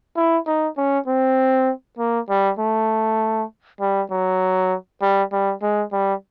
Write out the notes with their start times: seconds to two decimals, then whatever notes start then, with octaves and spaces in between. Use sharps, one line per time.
0.16 E4
0.47 D#4
0.77 C#4
1.07 C4
1.98 A#3
2.29 G3
2.59 A3
3.80 G3
4.11 F#3
5.01 G3
5.32 G3
5.62 G#3
5.92 G3